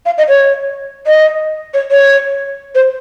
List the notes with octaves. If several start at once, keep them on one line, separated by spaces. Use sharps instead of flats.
F5
D#5
C#5
D#5
C#5
C#5
C5